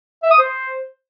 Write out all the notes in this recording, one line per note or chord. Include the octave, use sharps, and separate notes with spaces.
E5
D#6
C5